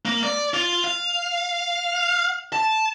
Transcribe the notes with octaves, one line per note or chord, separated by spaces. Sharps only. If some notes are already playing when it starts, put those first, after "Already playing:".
A#3
D5
F4
F5
A5